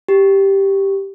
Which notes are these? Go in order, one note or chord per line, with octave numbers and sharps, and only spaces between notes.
G4